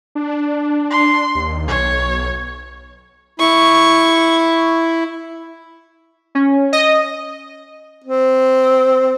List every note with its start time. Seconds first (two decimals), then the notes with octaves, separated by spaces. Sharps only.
0.15 D4
0.90 C6
1.35 D#2
1.68 B1 C#5
3.40 E4 C#6
6.35 C#4
6.73 D#5
8.04 C4